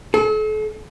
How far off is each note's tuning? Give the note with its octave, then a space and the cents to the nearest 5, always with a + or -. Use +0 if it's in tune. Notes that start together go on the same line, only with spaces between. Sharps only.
A4 -40